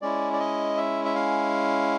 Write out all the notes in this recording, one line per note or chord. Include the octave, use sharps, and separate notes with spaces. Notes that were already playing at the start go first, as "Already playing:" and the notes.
G#3 C#4 E4 D5
D5
D#5
E5
E5
F5